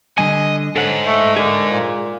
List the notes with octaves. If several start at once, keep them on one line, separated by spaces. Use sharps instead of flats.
D3 G3 D#5 G#5
G#2 A4 C#5 F#5
A3
D3 G#4 A#4
A#2